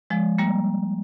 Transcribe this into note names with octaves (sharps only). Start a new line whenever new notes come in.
F3 G#3
G3 A#3